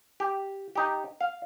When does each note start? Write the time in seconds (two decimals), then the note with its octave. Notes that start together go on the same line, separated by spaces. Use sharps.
0.20 G4
0.76 D#4 G4
1.21 F5